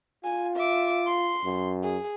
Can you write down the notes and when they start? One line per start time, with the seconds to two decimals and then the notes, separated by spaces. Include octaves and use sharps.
0.24 F4 G#5
0.56 E5 D6
1.07 C6
1.44 F#2
1.83 G#4